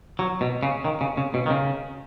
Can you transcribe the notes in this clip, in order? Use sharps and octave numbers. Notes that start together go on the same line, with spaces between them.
F#3
B2
C#3
D#3
C#3
C#3
B2
D#3
C#3